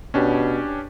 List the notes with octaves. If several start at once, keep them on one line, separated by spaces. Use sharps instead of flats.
B2 C#4 D4 G4